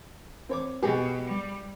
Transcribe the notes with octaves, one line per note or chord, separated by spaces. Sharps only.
C4 C#5 D6
B2 G4 G#4
G3